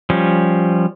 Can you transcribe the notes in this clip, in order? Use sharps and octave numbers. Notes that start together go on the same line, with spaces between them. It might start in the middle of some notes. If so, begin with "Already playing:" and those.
F3 G3 C#4